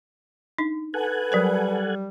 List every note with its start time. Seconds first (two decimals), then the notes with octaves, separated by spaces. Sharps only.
0.58 D4 D#4
0.94 A4 B4 F#5 G#5
1.32 F#3 G3 A#4 C5